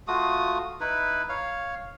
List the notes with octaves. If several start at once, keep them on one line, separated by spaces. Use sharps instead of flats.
A3 F4 F#4 D#6
D#4 E4 B4
C#5 F5